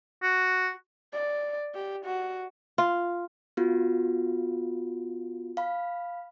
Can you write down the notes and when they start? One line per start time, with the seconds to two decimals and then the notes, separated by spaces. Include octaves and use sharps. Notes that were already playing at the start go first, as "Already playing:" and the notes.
0.23 F#4
1.13 D5
1.75 G4
2.05 F#4
2.78 F4
3.57 B3 F4 F#4
5.57 F5 B5